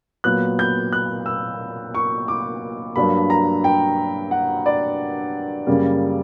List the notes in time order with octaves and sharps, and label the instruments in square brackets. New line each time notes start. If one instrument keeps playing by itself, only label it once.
[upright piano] A#2 F#3 B3 F#6
G6
F#6
E6
C#6
D6
G2 F#3 A#3 D4 B5
A#5
G5
F#5
D5
F#2 C#3 G3 A#3